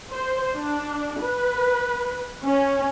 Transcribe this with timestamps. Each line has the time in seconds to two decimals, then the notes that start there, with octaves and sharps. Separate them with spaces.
0.12 C5
0.55 D4
1.23 B4
2.45 C#4